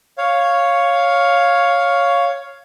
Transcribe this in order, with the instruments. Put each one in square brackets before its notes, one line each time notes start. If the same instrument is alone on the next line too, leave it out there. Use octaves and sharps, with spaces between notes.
[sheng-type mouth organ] C#5 F5